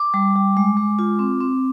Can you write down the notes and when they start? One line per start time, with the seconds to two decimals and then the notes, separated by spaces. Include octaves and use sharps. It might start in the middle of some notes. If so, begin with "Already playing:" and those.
Already playing: D6
0.14 G3
0.36 G3
0.57 G#3
0.77 G#3
0.99 F4
1.19 C4
1.40 C4